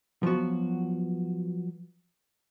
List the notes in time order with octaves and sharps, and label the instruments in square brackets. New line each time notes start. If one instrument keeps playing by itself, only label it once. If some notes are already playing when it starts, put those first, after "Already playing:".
[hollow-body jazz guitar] F3 F#3 B3 F#4